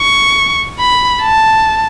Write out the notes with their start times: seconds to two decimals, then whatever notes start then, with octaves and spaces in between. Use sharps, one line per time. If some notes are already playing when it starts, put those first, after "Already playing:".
Already playing: C#6
0.79 B5
1.22 A5